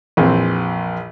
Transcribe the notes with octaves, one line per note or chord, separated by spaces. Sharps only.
A#1 F2 E3 C4